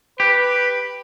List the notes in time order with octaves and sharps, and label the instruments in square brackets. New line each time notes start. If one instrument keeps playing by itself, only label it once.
[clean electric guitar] G4 [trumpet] B4